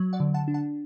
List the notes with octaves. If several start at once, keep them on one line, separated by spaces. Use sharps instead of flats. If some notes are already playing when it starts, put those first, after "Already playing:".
Already playing: F#3
D5 F#5
D3
F#5 A5
D4
F#5 A5